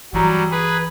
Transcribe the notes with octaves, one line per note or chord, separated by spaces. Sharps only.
G1 E3 F#3 G3 A#5
G#4 B4